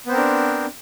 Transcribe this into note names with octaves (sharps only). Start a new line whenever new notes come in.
B3 C4 D4 A#4 C5